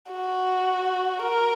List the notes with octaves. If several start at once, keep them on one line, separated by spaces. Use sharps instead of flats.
F#4
A#4